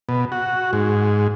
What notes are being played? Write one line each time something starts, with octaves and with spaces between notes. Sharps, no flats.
B2
F#4
G#2